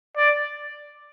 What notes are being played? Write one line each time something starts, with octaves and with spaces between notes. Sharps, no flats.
D5